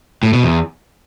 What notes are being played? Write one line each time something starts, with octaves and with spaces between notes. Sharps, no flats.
A2
B2
E2